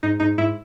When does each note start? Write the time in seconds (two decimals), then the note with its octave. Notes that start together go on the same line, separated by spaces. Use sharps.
0.03 G#2 D#4
0.20 G#2 D#4
0.38 G#2 E4